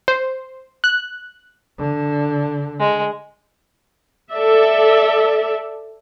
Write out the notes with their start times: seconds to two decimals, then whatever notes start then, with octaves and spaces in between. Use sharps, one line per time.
0.08 C5
0.84 F#6
1.79 D3
2.80 G#3
4.32 A4 D5 E5